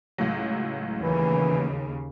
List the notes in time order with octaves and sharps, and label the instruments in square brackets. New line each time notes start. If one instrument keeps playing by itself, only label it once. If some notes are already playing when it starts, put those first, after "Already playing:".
[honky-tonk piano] C#2 A2 F#3
[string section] D#2 C#3 [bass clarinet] E3